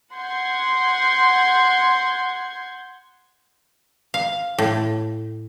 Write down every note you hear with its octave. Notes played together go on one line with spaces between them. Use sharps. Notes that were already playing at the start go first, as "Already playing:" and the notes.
F#5 C6 G6 G#6
F5
A2